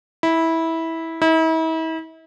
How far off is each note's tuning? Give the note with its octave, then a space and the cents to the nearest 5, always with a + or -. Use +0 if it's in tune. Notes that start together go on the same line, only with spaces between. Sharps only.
E4 -15
E4 -40